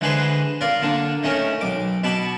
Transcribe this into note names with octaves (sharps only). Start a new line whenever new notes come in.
D3 E3 G#3 G#4 B4 C5
F4 A#4 D5
D3 A#3 D4
D#3 A3 C#4 A#4
B1 D6
B2 A5 B5 D6